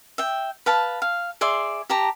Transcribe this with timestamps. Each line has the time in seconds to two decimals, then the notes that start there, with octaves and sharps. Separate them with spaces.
0.18 E5 G5
0.66 B4 F5 A5
1.02 F5
1.41 G#4 D5 E5 C6
1.90 G4 A5 A#5